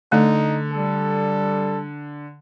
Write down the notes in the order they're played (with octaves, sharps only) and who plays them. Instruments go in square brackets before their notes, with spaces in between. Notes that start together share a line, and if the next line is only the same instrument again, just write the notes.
[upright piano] D3 [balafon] A3 [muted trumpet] D#4
[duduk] G3 [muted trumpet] A4